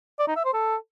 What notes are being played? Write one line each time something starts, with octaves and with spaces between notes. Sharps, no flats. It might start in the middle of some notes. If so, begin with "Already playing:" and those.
D5
D#4
E5
C5
A4